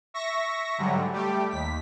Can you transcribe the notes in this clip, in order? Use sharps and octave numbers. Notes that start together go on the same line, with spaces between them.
E5 C#6 A#6
G#2 D3 F#3 G3
G3 A3 G4
D#2 B6